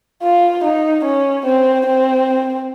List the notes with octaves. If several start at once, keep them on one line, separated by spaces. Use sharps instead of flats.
F4
D#4
C#4
C4
C4